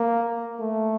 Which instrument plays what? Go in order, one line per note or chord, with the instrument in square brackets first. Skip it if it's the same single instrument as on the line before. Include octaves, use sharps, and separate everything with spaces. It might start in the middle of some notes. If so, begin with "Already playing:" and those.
Already playing: [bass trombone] A#3
A3